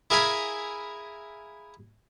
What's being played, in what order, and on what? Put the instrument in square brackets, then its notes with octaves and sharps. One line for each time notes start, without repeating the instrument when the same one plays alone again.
[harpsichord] E4 G#4 A#4 F5 G#5 B5